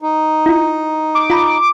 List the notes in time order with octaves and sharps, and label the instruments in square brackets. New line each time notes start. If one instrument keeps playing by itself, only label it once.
[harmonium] D#4
[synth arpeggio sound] E4 F4
[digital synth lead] D6
[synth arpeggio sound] F4 A#5 B5